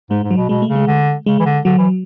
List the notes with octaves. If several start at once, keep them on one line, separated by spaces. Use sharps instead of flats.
G#2 G#3
G#2
F#3
B2
B2 G#3
A3
C#3
G#3
D3
C#3 G#3
E3
D3
D3 F#3
E3